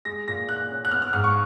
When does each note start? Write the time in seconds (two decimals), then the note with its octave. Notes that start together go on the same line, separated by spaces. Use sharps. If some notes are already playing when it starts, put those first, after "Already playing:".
0.05 G#3 A#6
0.28 A#2 A#6
0.49 A#2 F#6
0.70 C#4
0.85 F#6
0.91 B3 F6
1.02 F6
1.13 G#2 F6
1.24 C#6